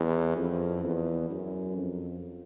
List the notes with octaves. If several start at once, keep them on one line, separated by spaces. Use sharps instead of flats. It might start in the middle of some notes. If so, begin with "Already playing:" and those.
Already playing: E2
F2
E2
F#2
F2